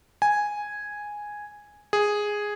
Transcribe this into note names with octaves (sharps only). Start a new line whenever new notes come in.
G#5
G#4